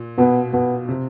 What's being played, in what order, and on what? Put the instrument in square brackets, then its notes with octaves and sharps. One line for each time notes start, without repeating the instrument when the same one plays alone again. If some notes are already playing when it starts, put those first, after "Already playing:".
Already playing: [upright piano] A#2
[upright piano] B2 [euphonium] B3
[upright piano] B2 [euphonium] B3
[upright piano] C3